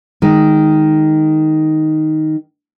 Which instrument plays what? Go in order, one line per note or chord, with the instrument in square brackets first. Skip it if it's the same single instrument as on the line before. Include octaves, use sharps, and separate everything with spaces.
[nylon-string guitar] D#3 G#3